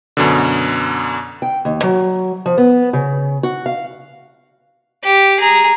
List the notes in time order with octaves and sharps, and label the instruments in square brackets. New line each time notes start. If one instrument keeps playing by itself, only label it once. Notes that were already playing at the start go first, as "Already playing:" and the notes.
[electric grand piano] F#2 B2 D3
[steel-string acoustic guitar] G5
D#2
F#3
F3
B3
C#3
F#4
F5
[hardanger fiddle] G4
G#4 A#5